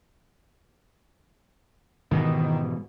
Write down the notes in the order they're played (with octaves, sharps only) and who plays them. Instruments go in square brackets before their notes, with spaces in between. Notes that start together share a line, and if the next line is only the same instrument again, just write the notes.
[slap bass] G#2 B2 E3 [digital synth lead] D#3